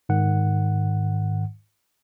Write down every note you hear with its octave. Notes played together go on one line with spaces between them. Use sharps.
G#2 D#3 F#5